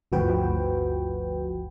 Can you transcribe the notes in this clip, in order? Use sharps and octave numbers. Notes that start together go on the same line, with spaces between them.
G1 D2 F3 F#4 B4 G5